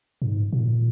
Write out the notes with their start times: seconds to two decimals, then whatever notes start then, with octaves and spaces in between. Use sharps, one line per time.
0.22 G#2
0.53 A#2